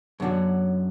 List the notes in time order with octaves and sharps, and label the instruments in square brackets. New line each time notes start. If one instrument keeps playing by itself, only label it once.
[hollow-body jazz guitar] F#2 D3 F#3